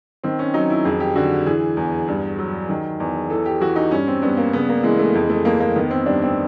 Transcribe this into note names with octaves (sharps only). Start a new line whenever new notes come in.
D#3 C4
C#4
F#3 D#4
E4
F2 G#4
G4
D3 F#4
E3 G#4
E2
G2
F#3
D#3
E2
E3 A4
G4
E3 F#4
D#4
G2 C#4
C4
G2 B3
A#3
C#3 B3
A#3
E3 G#3
A3
F2 G#3
A3
F2 A#3
A#3
D#3 B3
C4
G2 D4
C4